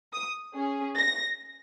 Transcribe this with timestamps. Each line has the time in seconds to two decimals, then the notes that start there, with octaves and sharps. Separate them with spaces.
0.13 D#6
0.55 C#4 G#4
0.97 A#6